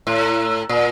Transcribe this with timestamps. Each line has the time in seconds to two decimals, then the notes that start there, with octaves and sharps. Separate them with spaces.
0.07 A2
0.69 A#2